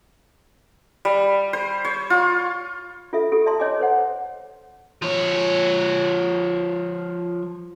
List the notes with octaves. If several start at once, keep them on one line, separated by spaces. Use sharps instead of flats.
G3
C5
C#5
F4
F4 A4 E5
F4 G4 A4
D5 E5 A5 C6
C#5 D#5 G#5 D6
A4 B4 C5 F#5
F3 C#5